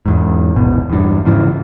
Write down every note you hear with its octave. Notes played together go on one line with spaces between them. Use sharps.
E2 G#2
D#1 G#1 B2
E2 G2
G#2 C#3 E3 F3